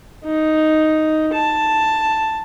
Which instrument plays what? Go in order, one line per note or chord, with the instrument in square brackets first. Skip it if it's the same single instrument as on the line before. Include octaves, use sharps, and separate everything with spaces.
[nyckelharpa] D#4
A5